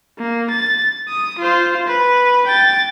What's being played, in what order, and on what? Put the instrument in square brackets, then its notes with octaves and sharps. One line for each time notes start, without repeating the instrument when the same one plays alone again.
[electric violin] A#3
A6
D#6
F4 C5
B4
G5 A6